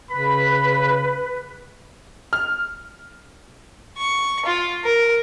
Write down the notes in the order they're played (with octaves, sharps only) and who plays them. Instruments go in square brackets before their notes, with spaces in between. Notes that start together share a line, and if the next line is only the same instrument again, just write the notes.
[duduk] C#3 [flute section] B4 [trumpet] B5
[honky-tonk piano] F6
[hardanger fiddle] C#6
F4
A#4